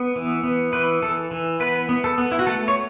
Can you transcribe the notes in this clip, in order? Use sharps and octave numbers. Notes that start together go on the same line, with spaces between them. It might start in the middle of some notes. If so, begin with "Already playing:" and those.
Already playing: B3
E3
B3
E3 B4
E3 A4
E3
B3 B4
B3
A4
B3
E4
F#4
A3 A4
C#5